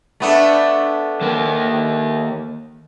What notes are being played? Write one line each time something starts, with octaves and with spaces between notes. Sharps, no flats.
A3 B3 D4
D#3 A#3 A#4